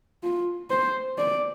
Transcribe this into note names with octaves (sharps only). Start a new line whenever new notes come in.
F4
C5
D5